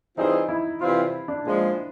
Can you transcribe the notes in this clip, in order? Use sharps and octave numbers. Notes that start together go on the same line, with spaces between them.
E3 G3 C4 D#4 F4 G#4
E4
C3 E3 G3 C4 F4
D4
A#2 F3 G#3